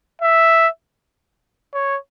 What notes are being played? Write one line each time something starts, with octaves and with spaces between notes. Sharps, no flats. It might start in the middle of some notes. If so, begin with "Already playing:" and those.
E5
C#5